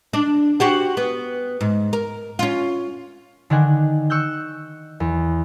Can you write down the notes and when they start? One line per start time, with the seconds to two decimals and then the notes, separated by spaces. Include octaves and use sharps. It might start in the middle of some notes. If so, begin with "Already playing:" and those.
0.13 D4
0.60 F#4 G4 C5
0.97 B3
1.61 G#2
1.93 A#4
2.39 C#4 F4
3.50 D3 D#3 D4 F#5 G#5
4.10 C#6 E6 F#6 G6
5.00 E2